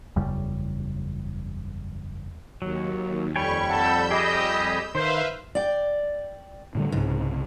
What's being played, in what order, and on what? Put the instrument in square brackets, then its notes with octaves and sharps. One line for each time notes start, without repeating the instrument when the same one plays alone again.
[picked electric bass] F#1 E2 C#3 G3
[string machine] D#2 [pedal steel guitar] F#3
[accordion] F2 G3 B5 [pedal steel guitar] C#5 G5 G#5 [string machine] C#6
[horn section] A4 F#5 A5 [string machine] E6 G6
[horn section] G4 D#5 [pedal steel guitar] G#4
[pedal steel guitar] D#3 [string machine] B4 E5 F5 [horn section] C5
[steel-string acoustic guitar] D5 G5
[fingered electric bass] A2 D3 G3
[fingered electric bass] C2 C#3 [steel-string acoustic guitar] G#2